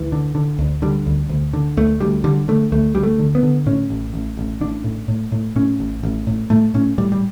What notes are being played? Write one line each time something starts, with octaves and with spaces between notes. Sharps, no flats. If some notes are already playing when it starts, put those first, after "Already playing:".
Already playing: D2 E3
D3
D3
D2
D3 G3
D2
D2
D3
D2 A3
D2 G3
D3 G3
D3 A3
D2 A3
D2 G3
A3
D3
B3
D3
A2 C#4
A1
A1
A1
A1 D4
A2
A2
A2
A2 C#4
A1
A1
A2
A2 A3
A2 C#4
A2 G3
G3